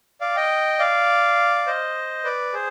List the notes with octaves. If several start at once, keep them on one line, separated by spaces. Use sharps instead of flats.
D5 F5
D#5 G5
D5 F5
C5 D#5
B4 D5
G#4 C5